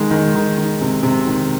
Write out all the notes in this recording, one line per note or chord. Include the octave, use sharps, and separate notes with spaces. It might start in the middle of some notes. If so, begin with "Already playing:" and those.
Already playing: D#3 G#3
D#3
D#3
D#3
C3
C3
D#3